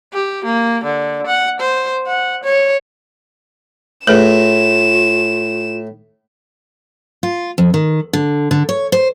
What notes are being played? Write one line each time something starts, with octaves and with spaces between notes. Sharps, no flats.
G4
A#3
D3
F#5
C5
F#5
C#5
A2 A3 F4 G#4 B4 E7
F4
F2
D#3
D3
D3
C#5
C5